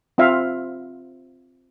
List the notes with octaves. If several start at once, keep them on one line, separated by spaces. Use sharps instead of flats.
C4 F4 E5 F5